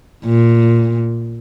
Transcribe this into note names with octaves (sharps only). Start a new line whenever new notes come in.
A#2